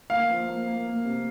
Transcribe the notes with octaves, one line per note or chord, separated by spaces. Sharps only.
A#3 F5
F3
A#3
A#3
A#3
C3